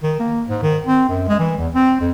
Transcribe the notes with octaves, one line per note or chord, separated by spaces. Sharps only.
D#3
A#3
G#2
D#3
C4
F#2
G#3
E3
E2
C4
F2